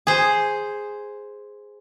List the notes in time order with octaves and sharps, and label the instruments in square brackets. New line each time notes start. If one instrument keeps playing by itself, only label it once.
[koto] G#4 C5